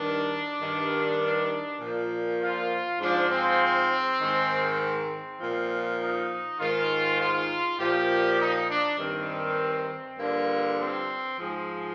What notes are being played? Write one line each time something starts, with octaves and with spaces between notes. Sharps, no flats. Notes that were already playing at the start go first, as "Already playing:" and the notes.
Already playing: G2 D#3 D4
G2 D#3
A#2 F3
F4
G#2 F3 D4
C4
G#2 D#3
C4
A#2 F3
D#4
G#2 D#3 F4
F4
A#2 F3 G4
D#4
D4
G2 D#3 C4
G2 D3 F3 A#3
C4
G#2 F3 G#3